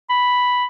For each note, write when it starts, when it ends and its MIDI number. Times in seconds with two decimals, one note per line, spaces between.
0.10 0.65 83